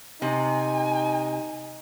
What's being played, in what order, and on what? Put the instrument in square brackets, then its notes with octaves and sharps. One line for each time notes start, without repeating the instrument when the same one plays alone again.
[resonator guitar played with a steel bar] C3 [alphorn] D#4 [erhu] G#5